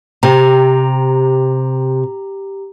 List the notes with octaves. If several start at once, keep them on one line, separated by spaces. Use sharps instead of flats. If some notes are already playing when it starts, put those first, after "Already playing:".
C3 G4 A#5